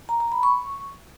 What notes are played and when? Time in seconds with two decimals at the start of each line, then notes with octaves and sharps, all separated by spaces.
0.09 A#5
0.20 A#5
0.32 B5
0.43 C#6